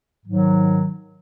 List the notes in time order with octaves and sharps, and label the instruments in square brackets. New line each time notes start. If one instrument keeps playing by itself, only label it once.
[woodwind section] G#2 D#3 F#3